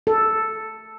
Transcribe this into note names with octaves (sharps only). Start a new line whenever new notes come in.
A4